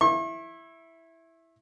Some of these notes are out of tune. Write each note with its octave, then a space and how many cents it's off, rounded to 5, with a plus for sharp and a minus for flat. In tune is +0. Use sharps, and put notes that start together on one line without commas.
E4 +0 C#6 -45